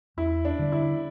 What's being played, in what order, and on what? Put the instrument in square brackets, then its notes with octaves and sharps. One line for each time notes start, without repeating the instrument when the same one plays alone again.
[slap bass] E2 [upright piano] E4
[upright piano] D4
[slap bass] D3 G3
[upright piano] E4